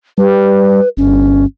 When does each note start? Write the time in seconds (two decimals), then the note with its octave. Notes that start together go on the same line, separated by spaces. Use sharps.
0.18 G3 B4
0.97 G1 C#4